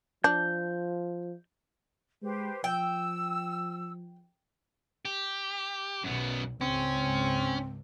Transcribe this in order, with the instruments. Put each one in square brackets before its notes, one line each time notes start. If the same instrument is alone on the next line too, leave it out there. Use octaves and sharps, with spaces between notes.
[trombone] F3 [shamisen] D4 [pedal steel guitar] G6
[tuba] G#3 [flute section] G4 B4 C5
[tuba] F3 [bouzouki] G5 [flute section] E6
[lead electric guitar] G4
[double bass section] B1 [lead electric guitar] F#2 B3
[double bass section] C#2 G#2 [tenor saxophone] C4 [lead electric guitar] C#4